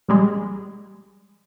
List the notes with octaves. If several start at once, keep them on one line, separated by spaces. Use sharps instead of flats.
A#1 G3 G#3